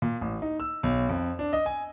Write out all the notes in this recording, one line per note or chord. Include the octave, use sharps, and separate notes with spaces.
A#2
A1
D#4
E6
B1
F2
D4
D#5
G#5